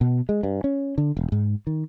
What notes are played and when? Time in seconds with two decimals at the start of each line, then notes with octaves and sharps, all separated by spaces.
0.01 B2
0.29 G#3
0.43 G2
0.64 C#4
0.98 D3
1.17 E1
1.32 G#2
1.67 D#3